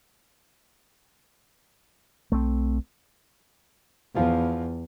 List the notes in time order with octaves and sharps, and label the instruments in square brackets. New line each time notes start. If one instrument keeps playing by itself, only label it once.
[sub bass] B1 [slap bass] A3 C4
[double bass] E2 [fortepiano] F3 F4